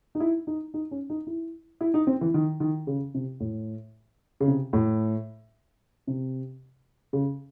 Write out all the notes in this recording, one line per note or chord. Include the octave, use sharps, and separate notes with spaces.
D#4
E4
D#4
D#4
C#4
D#4
E4
E4
D#4
C4
E3
D#3
D#3
C#3
C3
A2
C#3
C3
A2
C3
C#3